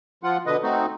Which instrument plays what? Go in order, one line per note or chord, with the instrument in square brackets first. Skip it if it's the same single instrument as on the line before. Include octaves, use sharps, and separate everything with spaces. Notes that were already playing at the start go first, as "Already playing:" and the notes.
[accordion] F3 F4 F#5
B2 D3 B4 D#5
A3 C4 D#4 F#4